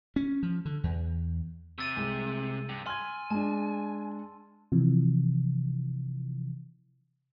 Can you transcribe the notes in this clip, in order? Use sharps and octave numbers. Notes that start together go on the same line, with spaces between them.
C#4
F3
D3
E2
C3 E6 A6 D#7
C2 G#3
G2
G#5 C6 F6 G#6
G#3 D4 A5
C3 E3 F3